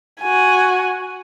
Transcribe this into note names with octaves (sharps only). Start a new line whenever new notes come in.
F#4 G#5